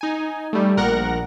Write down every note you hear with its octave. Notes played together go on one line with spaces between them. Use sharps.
D#4 G#5
G3 A3
A#1 A#4 F#5 A#6